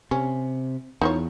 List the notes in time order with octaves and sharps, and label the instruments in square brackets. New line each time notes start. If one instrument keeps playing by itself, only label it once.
[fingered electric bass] C3 [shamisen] C#4
[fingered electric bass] E2 [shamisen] D#4 F4 C#5